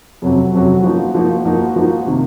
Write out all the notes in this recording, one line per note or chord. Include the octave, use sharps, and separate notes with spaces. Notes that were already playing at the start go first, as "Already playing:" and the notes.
F2 C3 F#3 C#4 F#4
F2 C3 F#3 C#4 F#4
F3 A#3 D#4 F#4
F3 A#3 D#4 F#4
F3 A#3 D#4 F#4
F3 A#3 D#4 F#4
C3 D#3 A#3